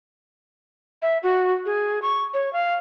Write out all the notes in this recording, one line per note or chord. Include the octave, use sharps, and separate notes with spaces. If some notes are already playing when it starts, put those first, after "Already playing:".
E5
F#4
G#4
C#6
C#5
F5